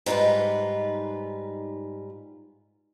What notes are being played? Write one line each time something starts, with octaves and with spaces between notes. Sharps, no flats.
G#2 G3 D#4 F4 B4